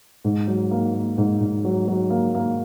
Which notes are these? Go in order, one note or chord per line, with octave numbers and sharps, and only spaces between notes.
G#2
F#3
A#3
A#3
G#2
G#2
F#3
F#3
A#3
A#3